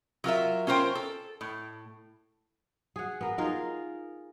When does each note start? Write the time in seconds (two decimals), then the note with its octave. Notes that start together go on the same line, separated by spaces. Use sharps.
0.24 F#3 F4 A#4 E5
0.67 C#4 F4 A#4 C5 G5
0.95 A4
1.41 A2
2.96 G#4 F#5
3.21 B3 A#4
3.38 D#4 F4 G#4 A#4